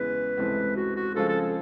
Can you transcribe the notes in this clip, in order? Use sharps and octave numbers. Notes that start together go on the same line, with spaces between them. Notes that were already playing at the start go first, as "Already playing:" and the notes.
Already playing: E2 C#3 E3 G#3 B4
C#2 C3 E3 A3 C4
F#4
F#4
C#3 F3 G#3 C4 F4 A4
A4
A4